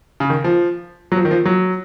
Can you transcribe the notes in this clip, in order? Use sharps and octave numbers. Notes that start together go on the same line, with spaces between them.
C#3
D#3
F3
F#3
F3
D#3
F3
F#3